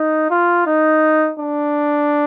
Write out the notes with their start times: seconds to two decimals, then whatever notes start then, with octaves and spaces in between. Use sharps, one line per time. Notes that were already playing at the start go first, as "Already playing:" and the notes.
Already playing: D#4
0.30 F4
0.66 D#4
1.39 D4